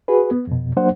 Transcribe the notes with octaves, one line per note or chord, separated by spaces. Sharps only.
F#4 G#4 B4
B3
F2 B2
F#3 A#3 D4 C5 F#5